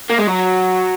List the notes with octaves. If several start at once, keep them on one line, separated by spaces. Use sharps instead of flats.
A#3
G#3
F#3